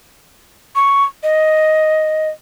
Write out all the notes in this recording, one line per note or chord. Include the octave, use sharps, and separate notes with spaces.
C#6
D#5